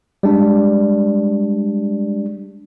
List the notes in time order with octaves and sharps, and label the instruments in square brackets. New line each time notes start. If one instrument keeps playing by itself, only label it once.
[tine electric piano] G3 G#3 D4